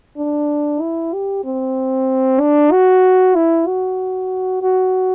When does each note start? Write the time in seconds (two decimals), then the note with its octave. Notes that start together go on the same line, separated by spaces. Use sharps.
0.17 D4
0.81 E4
1.14 G4
1.44 C4
2.40 D4
2.72 F#4
3.36 E4
3.67 F#4
4.62 F#4